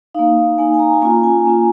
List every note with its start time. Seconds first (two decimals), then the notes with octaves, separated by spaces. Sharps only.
0.14 A#3 D#4 F5
0.58 A#3 D#4 G#5
0.74 G#5
0.79 A#5
0.93 G#5
1.02 A#3 C#4 F4 A#5
1.23 G#5
1.45 A#3 C#4 F4